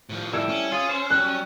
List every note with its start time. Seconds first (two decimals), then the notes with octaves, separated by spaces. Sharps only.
0.09 A2 F3
0.33 G3 E4 A4 E6
0.49 C#4
0.72 F4 G#4
0.89 C5
1.10 F#3 G3 F#6